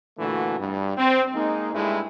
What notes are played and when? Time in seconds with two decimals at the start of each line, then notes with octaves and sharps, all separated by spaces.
0.19 A#2 D3 E3 A3 F#4
0.60 G2
0.97 C4
1.35 G#3 A#3 D#4
1.74 G2 G#3 A3 E4